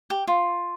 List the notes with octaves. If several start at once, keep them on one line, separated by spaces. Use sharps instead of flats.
G4
F4